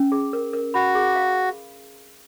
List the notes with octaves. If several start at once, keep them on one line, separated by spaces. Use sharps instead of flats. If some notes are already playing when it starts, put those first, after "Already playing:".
Already playing: C#4
G#4
A#4
A#4
F#4 B5
G#4
F5